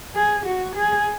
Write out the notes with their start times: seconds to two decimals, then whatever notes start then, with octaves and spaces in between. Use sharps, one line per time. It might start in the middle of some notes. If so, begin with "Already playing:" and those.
0.15 G#4
0.46 F#4
0.76 G#4